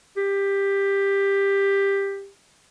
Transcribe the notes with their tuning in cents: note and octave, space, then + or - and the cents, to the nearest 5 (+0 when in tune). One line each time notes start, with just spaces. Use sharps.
G4 +15